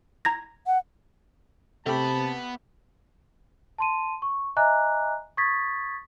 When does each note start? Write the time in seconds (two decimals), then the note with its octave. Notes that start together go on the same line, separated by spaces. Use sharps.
0.25 A#5 G#6 A#6
0.66 F#5
1.86 C3 A3 B3 G4 A5 B5
3.78 A5 C6 D#7
4.22 C#6
4.56 D#5 E5 G#5 A#5 D6 F#6
5.37 C#6 D#6 G#6 A6 B6